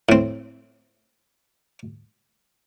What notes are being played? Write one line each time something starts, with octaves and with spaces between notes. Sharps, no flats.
A2 C4